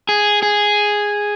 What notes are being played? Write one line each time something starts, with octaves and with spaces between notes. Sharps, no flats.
G#4
G#4